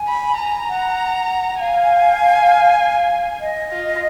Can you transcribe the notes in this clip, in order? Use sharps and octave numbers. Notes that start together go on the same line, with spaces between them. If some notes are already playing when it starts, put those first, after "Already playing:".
Already playing: G#5
B5
A#5
F#5
F5 G#5
D#5
F4